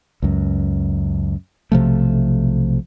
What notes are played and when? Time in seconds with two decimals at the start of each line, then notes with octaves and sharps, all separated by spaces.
0.22 C#2 F#2
1.72 B1 C3 F3 A3